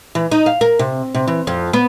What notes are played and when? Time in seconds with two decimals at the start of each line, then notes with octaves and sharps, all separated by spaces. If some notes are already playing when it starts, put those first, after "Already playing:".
0.15 E3
0.31 D#4
0.46 F5
0.61 A#4
0.79 C3
1.14 C3
1.28 E3
1.47 F2
1.73 B3